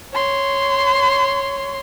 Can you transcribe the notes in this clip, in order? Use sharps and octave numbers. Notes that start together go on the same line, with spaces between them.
C#5 C6